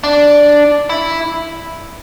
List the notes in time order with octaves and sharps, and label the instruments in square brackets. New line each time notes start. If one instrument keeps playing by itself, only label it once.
[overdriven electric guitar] D4
E4